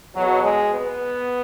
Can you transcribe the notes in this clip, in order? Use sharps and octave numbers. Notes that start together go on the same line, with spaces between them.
E2 B2 F#3
G#3
B3